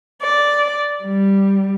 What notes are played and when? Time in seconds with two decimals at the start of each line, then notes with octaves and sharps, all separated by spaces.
0.22 D5
1.03 G3